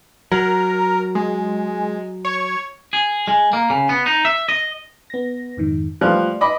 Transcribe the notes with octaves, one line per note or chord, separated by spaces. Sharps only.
F#3 A#4
G#3
C#5
G#4
G#3
A#3
C#3
B3
D#4
E5
D#5
B3 A#6
F2 G#2 D#3
F3 G3 A3 F4 D5 F#6
D#5 B5 D6